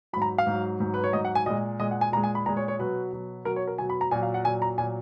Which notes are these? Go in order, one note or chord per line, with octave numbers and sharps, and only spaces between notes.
G#2 F#3 A#5 B5
F5
G#2 F#3
G#2 F#3
B4
C#5
G#2 F#3 D#5
F#5
G#5
A#2 G#3 D#5
A#2 G#3 D#5
F#5
G#5
A#2 G#3 A#5
G#5
B5
A#2 G#3 A#5
C#5
C#5
B2 F#3 B4
B2 F#3
B2 F#3 A#4
C#5
A#4
B2 F#3 G#5
B5
A#5
A#2 F#3 G#5
F5
F#5
A#2 F#3 G#5
A#5
A#2 F#3 G#5